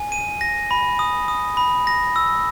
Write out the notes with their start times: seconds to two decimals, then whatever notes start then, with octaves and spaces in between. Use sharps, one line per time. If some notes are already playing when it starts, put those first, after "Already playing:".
Already playing: G#5
0.12 D#7
0.41 A#6
0.71 B5
0.99 D#6
1.28 D#6
1.57 B5
1.87 A#6
2.16 E6